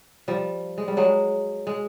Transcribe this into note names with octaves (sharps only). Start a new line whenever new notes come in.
F3 G3
G#3
G3
F#3 G#3
G#3